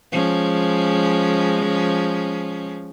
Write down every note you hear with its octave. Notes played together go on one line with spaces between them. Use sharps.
F3 G#3 C#4